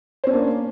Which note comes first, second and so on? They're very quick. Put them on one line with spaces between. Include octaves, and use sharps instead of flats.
C5 C#4 D4 A#3